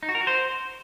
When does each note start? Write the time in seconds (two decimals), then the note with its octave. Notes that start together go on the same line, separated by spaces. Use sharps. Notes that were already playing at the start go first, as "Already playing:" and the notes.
0.03 D#4
0.09 F#4
0.15 A#4
0.21 F#4
0.27 C5